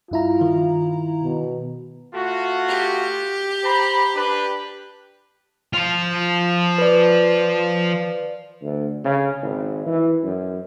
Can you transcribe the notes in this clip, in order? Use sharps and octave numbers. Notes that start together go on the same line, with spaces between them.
G2 E4 F4 A#5
D#3
B2
A3 F4 F#4
G4
C5 A#5 B5
D4 B4
F3 F4
B4 D5
D2
C#3
G#1
E3
F#2